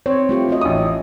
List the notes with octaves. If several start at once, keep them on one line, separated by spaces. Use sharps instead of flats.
C4 C#5
A3 F4 G4
A3 F#4 D#5
A1 D#6